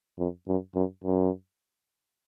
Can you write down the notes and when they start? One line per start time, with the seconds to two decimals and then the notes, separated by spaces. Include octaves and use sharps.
0.19 F2
0.47 F#2
0.75 F#2
1.04 F#2